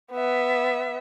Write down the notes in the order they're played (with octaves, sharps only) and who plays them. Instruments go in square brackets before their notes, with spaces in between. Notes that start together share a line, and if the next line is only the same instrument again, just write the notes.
[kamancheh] B3 E5